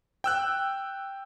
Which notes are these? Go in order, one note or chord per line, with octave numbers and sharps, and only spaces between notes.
G5 E6 F#6